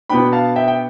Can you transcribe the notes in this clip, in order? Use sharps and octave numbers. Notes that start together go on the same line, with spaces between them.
B2 B3 D4 G5 B5
F5 A5
E5 G5
G5